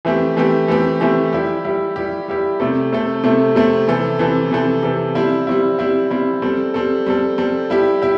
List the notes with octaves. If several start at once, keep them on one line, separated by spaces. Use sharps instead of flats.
E3 A3 C4 G4
E3 A3 C4 G4
E3 A3 C4 G4
E3 A3 C4 G4
G3 E4 G4
G3 E4 G4
G3 E4 G4
G3 E4 G4
C3 A3 C4 A4
C3 A3 C4 A4
C3 A3 C4 A4
C3 A3 C4 A4
C3 E3 C4 A4
C3 E3 C4 A4
C3 E3 C4 A4
C3 E3 C4 A4
G3 C4 E4
G3 C4 E4
G3 C4 E4
G3 C4 E4
G3 C4 A4
G3 C4 A4
G3 C4 A4
G3 C4 A4
G3 E4 G4
E4 G4